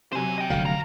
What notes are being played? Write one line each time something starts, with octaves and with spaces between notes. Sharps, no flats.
C3 F#3 C5 G#5
D#5 G5
F1 D3 F#3 F5
B3 A#5